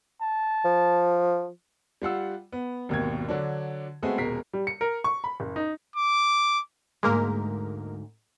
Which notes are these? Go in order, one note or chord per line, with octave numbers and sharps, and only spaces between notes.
A5
F3
G3 F4 F#5 E6
B3
G#1 D#2 B2 G#6
D3 F#3 D4
G#3 A3 B3 C4 F#4 G#4
D#1 B2 G#3 A#4 B6 C7
G3
C#7
A#4
C#6
B5
F#1
D#4
D6
D2 G#2 G#3 A#3 A#4